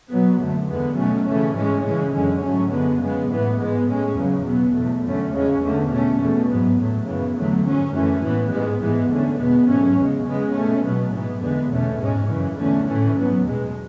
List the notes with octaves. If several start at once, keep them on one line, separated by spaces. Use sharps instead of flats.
B2 F#3 B3
F#2 D3 A3
E2 D3 G#3 B3
B2 F#3 A3 C#4
C#3 E3 A3 C#4
G#2 E3 G#3 C#4
C#3 E3 G#3 C#4
F#2 D3 G#3 C#4
G#2 F#3 A3 C#4
F#2 D3 G#3 B3
C#3 G#3 B3
A2 E3 B3
G#2 G#3 B3
A2 G#3 C#4
E2 C#3 F#3
B2 F#3 B3
E2 B2 A3
F#2 D3 A3 C#4
E2 C#3 G#3 C#4
E2 D3 A3
B2 A3 C#4
E2 B2 A3
G#2 F#3 B3
A2 F#3 A3
F#2 C#3 E3 B3
E2 D3 F#3 A3
G#2 F#3 C#4
F#2 E3 A3 C#4
A2 E3 B3
G#2 G#3 B3
G#2 E3 G#3 B3
E2 D3 A3 C#4
E2 B2 G#3 B3
G#2 F#3 A3 C#4
E2 C#3 G#3
C#3 G#3 B3
B2 A3 C#4
B2 F#3 B3
G#2 E3 B3
E2 D3 G#3 B3
E2 B2 A3 C#4
G#2 G#3 C#4
F#2 C#3 E3
E2 D3 A3 C#4
A2 E3 A3 C#4
G#2 F#3 B3
E2 B2 G#3